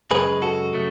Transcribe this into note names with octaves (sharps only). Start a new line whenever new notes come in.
F#2 C#3 G#3 G#4 B4
F#4 A4
C#3 F#3 A3